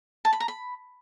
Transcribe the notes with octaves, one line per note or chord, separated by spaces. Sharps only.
A5
B5
A#5
B5